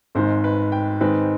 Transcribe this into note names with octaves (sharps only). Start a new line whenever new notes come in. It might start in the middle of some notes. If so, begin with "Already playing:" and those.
G#1 G#2 D#3 C5
B4
G5
G#2 D#3 G#3 C4 D#4 B4